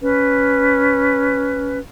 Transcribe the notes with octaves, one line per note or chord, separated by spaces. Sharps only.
C#4 B4